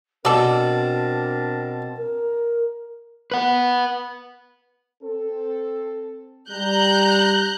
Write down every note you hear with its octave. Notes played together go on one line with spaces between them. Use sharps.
B2 C4 D4 A4 A#4 D5 A5
A#4
B4 F#5
C4 A4
G3 A#5 F#6 G6